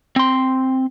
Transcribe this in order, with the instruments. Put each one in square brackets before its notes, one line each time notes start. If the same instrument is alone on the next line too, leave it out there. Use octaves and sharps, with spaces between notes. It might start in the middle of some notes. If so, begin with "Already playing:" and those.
[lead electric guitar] C4 C6